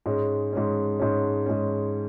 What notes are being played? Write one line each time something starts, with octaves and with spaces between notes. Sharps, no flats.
G#2 G#3 C#4
G#2 G#3 C#4
G#2 G#3 C#4
G#2 G#3 C#4